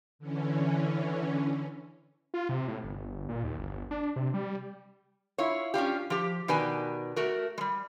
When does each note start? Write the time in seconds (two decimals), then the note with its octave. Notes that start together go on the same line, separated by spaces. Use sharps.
0.19 D3 E3 C#4
2.34 F4
2.49 C3
2.68 A2
2.84 G1
3.29 A#2
3.44 D#2
3.59 G1
3.91 D4
4.16 C3
4.34 G3
5.38 E4 F4 C#5
5.74 C#4 D4 F4 G4
6.10 F3 G4
6.48 B2 D#3 G4 B4 D5 G#5
7.16 A3 F#4 A#4
7.58 G3 G#3